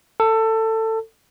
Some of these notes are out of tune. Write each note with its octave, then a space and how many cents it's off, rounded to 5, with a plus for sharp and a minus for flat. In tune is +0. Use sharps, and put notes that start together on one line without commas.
A4 +20